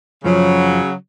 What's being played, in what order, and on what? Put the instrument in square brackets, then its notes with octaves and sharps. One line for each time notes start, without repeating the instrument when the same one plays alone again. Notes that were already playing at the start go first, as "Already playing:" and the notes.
[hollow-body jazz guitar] F#2 F3 [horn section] C#3 F#3